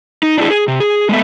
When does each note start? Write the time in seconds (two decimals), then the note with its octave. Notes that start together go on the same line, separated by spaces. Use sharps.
0.23 D#4
0.38 D4 E4 G#4
0.50 G#4
0.68 C3
0.80 G#4
1.09 G#3 A3 B3 E5